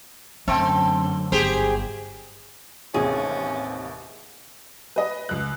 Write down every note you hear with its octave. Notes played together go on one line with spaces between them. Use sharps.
F#2 D3 A3 C4 C#4 G5 A5
G1 G4 G#4 C5
A1 D#2 C3 C#4 G#4
B4 D#5
C#2 F#6